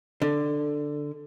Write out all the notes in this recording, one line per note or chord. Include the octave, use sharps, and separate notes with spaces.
D3